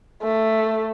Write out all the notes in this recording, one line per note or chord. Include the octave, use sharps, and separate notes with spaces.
A3